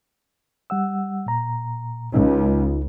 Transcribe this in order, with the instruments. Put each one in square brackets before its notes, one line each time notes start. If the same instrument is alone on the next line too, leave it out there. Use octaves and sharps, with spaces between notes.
[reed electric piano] G3 F#5 E6
A#2 A#5
[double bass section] C#2 [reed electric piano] D#4 F4